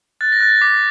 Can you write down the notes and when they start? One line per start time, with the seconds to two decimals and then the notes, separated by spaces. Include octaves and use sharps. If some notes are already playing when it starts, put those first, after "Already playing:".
0.21 F#6 A6
0.32 A#6
0.41 F#6 A6
0.61 D6 B6